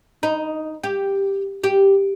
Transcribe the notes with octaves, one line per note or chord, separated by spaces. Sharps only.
D#4
G4
G4